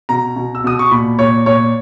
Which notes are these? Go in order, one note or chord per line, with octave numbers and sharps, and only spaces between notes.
B2 A#5
B2
E6
B2 D#6
C#6
A#2 B5
A#2 C#5
A#2 C#5